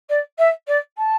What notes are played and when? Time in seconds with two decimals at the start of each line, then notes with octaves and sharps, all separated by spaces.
0.09 D5
0.38 E5
0.67 D5
0.97 A5